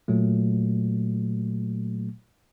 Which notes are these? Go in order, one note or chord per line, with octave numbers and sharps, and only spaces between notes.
A#2 F#3 A3